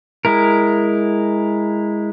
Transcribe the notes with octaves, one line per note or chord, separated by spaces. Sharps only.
G#3 E4 A#4